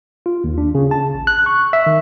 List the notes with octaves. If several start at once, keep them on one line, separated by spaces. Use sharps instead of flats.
F4
D#2
D4
C#3
A5
A1
F#6
C#6
E5
D#3